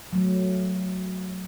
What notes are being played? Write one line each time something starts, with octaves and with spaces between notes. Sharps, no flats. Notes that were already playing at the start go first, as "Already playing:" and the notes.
F#3 A3